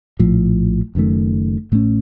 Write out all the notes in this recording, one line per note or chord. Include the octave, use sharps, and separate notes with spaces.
A#1 A2 F3
F#1 F#2 D#3 A3
A1 A2 A3 C#4